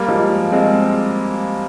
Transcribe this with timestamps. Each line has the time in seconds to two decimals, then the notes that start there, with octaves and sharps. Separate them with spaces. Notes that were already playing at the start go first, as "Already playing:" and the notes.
Already playing: G3 A#3
0.08 F3 G#3
0.52 G#3 C4